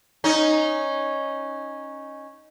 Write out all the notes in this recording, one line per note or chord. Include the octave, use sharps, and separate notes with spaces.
C#4 D#4